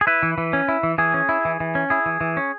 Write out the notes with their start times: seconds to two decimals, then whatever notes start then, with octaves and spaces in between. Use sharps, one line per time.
0.01 G#4
0.07 E4 B4
0.23 E3
0.38 E3
0.53 C#4
0.68 E4
0.83 E3
0.98 E3 G#4
1.14 C#4
1.29 E4
1.45 E3
1.60 E3
1.75 C#4
1.90 E4 G#4
2.06 E3
2.21 E3
2.37 C#4